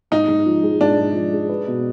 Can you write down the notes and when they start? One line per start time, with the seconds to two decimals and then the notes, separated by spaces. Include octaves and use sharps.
0.11 G#2 D#4
0.28 G#2
0.46 F3
0.63 G#3
0.81 G#2 D4
0.98 G#2
1.15 F3
1.32 G#3
1.49 B4
1.67 B2